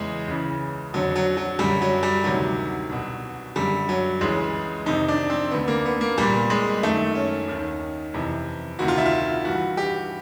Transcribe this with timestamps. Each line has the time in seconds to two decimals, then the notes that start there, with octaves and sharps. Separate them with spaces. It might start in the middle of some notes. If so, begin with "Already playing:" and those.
Already playing: E2 C#3 E3 G#3
0.28 C#2 C#3 E3
0.94 F2 D3 F#3
1.16 F#3
1.37 F#3
1.59 F#2 D3 G3
1.82 F#3
2.03 G3
2.24 D2 C3 D#3 F#3
2.89 C2 B2
3.56 F#2 D3 G3
3.89 F#3
4.21 C#2 C#3 E3 G#3
4.86 F2 C3 D#3 D#4
5.08 D4
5.30 C4
5.51 D2 D3 B3
5.68 A#3
5.85 B3
6.01 A#3
6.18 C2 A#2 G3
6.50 G#3
6.83 F#2 D#3 A3
7.15 C#4
7.48 D#2 D#3
8.14 F2 C3 E3
8.79 D2 C3 D#3 F#4
8.88 F4
8.98 E4
9.06 F4
9.44 G2 E3 F#4
9.77 G4